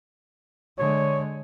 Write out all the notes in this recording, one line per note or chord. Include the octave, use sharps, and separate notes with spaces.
D3 G#3 C#5